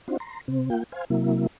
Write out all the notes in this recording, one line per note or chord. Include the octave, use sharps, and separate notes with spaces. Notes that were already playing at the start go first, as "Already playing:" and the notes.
C4 D4 D#4 F4 F#4 C5
A#5 C6
C3 C4
A#3 F4 G5
C5 F5 G#5
C3 F#3 A#3 E4